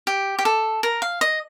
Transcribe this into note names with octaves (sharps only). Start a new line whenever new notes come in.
G4
G4
A4
A#4
F5
D#5